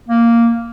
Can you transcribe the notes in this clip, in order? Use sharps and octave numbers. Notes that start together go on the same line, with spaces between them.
A#3